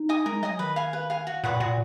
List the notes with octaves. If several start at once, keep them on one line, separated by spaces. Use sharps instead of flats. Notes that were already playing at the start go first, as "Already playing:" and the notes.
Already playing: D#4
D#5 G#5 D#6
G#3 A#4
F#3 D#5 G#5 D#6
D#3 B4
F5 G#5
B4
F5 G#5
F#4
A#2 B4 F#5 C#6
A#2 F#4